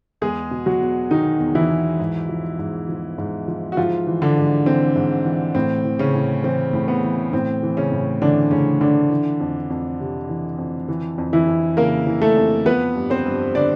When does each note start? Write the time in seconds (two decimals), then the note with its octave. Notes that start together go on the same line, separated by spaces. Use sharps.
0.21 E2 G#3 G#4
0.51 B2
0.66 F#3 F#4
0.81 E2
1.11 B2 D#3 D#4
1.40 E2
1.55 E3 E4
1.70 B2
1.99 G#2
2.29 F3
2.59 G#2
2.89 F3
3.18 G#2
3.48 F3
3.72 F#4
3.77 G#2 F3 F4
4.07 E3
4.22 D3 D4
4.36 G#2
4.66 E3 C4
4.96 G#2
5.25 E3
5.55 A2 C4
5.85 E3
5.99 C#3 C#4
6.14 A2
6.44 E3 C4
6.73 A2
6.88 B3
7.03 E3
7.33 A2 C4
7.63 E3
7.77 C#3 C#4
7.92 A2
8.22 D3 E3 D4
8.51 A2 C#3 C#4
8.81 D3 E3 D4
9.10 E3
9.40 F2
9.70 F2
10.00 C3
10.29 E3
10.58 F2
10.88 E3
11.18 F2
11.33 E3 E4
11.48 F2
11.77 C#3 A#3 A#4
12.07 E3
12.22 A3 A4
12.37 F2
12.66 F3 B3 B4
12.96 G2
13.10 C4 C5
13.26 G2
13.55 D3 D4 D5